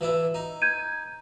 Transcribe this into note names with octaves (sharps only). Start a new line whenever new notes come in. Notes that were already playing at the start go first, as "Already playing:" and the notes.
E3 D4 E4
D#4
G6 G#6 D#7